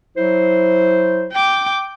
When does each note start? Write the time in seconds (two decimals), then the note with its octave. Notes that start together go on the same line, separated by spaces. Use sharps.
0.17 F#3 E4 C5
1.32 G5 D6